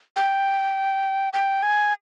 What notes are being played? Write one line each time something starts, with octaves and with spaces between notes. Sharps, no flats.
G5
G5
G#5